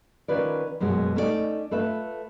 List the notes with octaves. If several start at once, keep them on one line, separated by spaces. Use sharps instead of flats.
D#3 C#4 F4 B4 D5
F#2 B2 G#3 F#4
A3 C#4 D#4 E4 D5
A3 F4 B4 E5